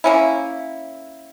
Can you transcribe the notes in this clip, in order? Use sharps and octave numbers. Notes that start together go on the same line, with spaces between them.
A#3 C#4 E4